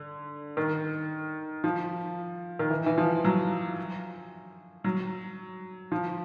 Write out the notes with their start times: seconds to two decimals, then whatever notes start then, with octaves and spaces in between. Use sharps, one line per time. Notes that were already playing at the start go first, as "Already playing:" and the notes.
Already playing: D3
0.57 D#3
1.64 F3
2.59 D#3
2.70 E3
2.86 E3
2.98 F3
3.25 F#3
4.84 F#3
5.92 F3